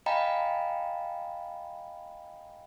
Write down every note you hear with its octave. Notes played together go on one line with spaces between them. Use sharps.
D#5 F5 G5 G#5 A#5 B5